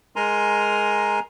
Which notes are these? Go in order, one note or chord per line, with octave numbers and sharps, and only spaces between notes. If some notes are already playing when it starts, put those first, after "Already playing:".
G#3 A#4 G#5 A#5 C6